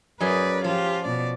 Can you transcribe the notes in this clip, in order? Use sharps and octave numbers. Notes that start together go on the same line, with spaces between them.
F#2 F#3 G#4 B4 D5
F3 F4 G4
B2 D5